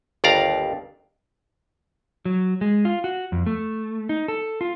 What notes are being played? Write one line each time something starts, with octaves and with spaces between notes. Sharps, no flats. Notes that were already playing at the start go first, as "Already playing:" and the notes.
G1 D#2 D5 F5 A#5
F#3
G#3
F4
F#4
F2
A3
D#4
A4
F4